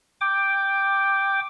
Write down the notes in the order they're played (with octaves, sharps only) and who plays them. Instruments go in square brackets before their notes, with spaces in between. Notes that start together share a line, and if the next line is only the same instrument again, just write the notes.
[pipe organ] G5 D6